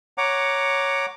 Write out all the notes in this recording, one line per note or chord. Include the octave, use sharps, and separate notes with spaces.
C#5 F#5 A#5 D6